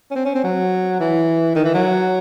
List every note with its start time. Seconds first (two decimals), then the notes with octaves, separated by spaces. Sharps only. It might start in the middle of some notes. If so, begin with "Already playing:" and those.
0.11 C#4
0.16 C4
0.25 C#4
0.35 C4
0.44 F#3
1.00 E3
1.55 D#3
1.65 E3
1.74 F#3